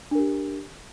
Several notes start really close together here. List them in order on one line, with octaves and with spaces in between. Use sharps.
D4 A#4 G4